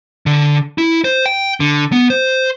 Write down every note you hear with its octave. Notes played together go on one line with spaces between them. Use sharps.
D3
E4
C5
G5
D3
B3
C5